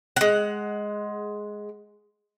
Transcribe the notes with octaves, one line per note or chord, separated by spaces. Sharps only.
G#3 F#5